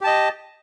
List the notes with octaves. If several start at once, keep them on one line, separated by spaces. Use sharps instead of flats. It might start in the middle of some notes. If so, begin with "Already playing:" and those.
G4 D#5 A5